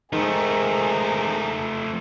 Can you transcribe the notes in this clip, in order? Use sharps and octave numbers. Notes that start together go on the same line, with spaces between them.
G#2 D#3 F3 A3 G#4 A#5